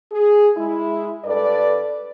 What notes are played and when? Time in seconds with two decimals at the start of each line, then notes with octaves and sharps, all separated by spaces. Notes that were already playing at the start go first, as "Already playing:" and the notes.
0.12 G#4
0.57 G#3 E4
1.25 G2 A4 B4 D5